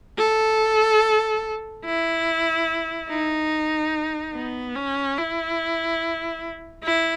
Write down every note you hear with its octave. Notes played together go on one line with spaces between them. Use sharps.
A4
E4
D#4
B3
C#4
E4
E4